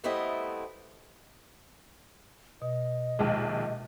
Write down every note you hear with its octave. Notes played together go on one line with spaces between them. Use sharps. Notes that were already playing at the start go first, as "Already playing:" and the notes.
G3 A3 B3 C4 E4 D#5
B2 D#5
A#1 D#2 G#3